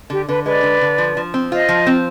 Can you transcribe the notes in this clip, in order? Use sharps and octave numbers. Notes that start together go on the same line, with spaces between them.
D3 G4
D3 B4
G#3 B4 D5
D3
D3
F3
F3
C4
F4 C5 D#5
F3
C4